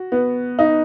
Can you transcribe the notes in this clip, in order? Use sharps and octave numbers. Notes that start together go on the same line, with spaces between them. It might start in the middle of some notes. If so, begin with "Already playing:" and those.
Already playing: F#4
B3
D#4